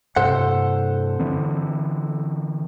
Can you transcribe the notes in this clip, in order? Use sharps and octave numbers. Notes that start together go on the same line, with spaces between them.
G2 C3 A4 C5 F#5
D3 E3 C4